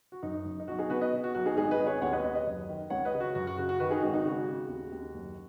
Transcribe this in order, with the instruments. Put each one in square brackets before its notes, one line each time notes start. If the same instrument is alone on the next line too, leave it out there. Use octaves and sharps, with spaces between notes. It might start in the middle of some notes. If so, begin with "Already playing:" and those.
[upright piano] F#4
F#2 D#4
F#1
D#4
B1 F#4
D#4 G#4
B2 F#4 B4
B4 D#5
B2
F#4
B1 F#4
D#4 G#4
G#1 D#4 G#4
B4 D#5
G#1
G#4 C#5
D#2 C#5 F#5
B4 D#5
D#2 B4 D#5
B4 D#5
F#1
D#3
C#2 C#5 F#5
B4 D#5
C#3
F#4
F#2 F#4
F#4
C#3 F#4
F#4
D#3 F#4 B4
D#4 G#4
G#1 F#4
D#4
C#3 F#4
C#3
D#2
D#2
F#1